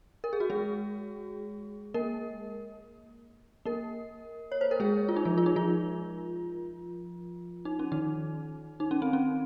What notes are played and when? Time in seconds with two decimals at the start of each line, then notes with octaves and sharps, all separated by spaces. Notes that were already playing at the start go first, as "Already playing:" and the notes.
0.24 A#4
0.33 G#4
0.40 F#4
0.50 G#3 G#4
1.94 A#3 A#4
3.65 A#3 A#4
4.52 C#5
4.61 C5
4.71 A#4
4.80 G#3 G#4
5.09 F4
5.16 D#4
5.25 F3 F4
5.38 F4
5.46 D#4
5.56 F3 F4
7.65 D#4
7.79 C#4
7.92 D#3 D#4
8.80 D#4
8.91 C#4
9.02 C4
9.13 C#4